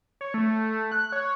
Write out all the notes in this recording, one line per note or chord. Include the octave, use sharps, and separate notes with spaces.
C#5
A3
F#6
C#5